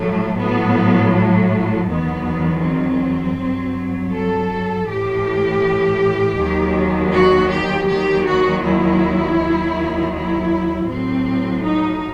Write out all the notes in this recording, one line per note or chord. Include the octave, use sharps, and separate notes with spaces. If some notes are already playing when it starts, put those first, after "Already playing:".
Already playing: A2 F#3 A3
A2 F#3 B3
A3
E2 D#3 F#3 B3
C4
G2 F#3
A4
A2 E3 G4
D#2 D#3 F#3
F#4
G4
D#2 D#3 F#3 G4
F#4
E4
D#2 D#3 F#3
E4
A2 F#3 C4
D#4